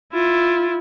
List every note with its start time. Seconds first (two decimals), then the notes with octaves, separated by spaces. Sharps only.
0.13 E4 F4